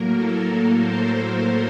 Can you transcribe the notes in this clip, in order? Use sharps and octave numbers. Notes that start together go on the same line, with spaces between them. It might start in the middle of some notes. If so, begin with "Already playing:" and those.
Already playing: A2 F#3 A#3 A#4
A4
C5